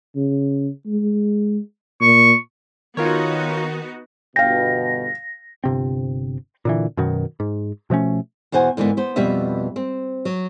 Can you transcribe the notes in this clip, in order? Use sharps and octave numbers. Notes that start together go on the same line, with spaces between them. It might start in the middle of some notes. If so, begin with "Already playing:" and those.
C#3
G#3
A#2 C#6
D#3 B3 D#4 F4 F#4 A#4 C#5
G1 B2 F5 G5 A#6
G1 C3 C4
A#2 D3 E3
F#2 B2 D#3 F#3
G#2
B2 F3 A3 C#4
E2 B2 C5 F#5 G#5
G#2 D3 E3 A#3 B3
B3 C5
F2 B2 G3 B4 E5
C4
F#3